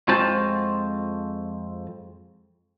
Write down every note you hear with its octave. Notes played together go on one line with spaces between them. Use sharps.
F2 G#3 F4 F#4 C5 A5